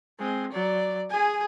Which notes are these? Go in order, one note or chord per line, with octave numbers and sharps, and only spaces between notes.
G#3 C4
F#3 D5
G#4 G#5